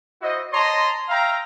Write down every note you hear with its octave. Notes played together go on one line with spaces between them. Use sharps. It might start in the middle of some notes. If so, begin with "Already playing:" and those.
E4 F#4 C5 D#5
C#5 D#5 A5 A#5 C6
E5 F5 G5 A#5